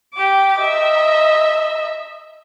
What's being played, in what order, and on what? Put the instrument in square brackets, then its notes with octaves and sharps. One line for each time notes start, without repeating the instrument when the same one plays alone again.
[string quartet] G4 D6
[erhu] D#5 [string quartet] E5